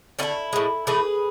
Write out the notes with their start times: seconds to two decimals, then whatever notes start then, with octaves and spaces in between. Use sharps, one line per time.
0.19 D3 A3 C#4 E4
0.53 A2 G#3
0.87 A2 E3 A3 G#4 B4